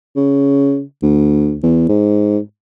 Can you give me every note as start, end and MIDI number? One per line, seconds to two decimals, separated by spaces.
0.16 0.82 49
1.02 1.57 38
1.63 1.87 40
1.89 2.39 44